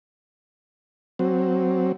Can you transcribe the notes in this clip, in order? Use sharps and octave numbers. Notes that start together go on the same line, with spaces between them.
F#3 C4